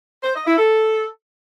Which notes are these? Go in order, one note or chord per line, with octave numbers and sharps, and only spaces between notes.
C5
D#5
E4
A4